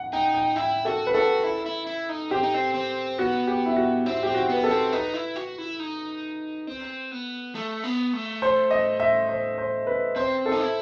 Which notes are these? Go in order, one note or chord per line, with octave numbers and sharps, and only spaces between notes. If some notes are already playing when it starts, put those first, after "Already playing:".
Already playing: F#5
D#4 G5
G5
E4 G5
F#4 A4
B4
F#4 A4
E4
E4
E4
D#4
C4 G4
D#4
C4
C4
B3 F#4
G4
E4
F#4
C4 E4
C4 G4
F#4
B3 B4
A4
C4
D#4 B4
E4
F#4
E4
D#4
C4
B3
A3
B3
A3
C5
D#5
E5
C5
C5
B4
C4 C5
A4
D#4
E4